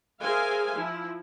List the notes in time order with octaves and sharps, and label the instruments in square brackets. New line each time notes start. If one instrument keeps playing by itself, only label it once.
[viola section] G#4 A#4 C5 E5 F5 G#5
F3 E4